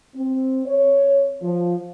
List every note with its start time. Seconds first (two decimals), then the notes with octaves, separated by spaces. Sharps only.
0.15 C4
0.66 C#5
1.42 F3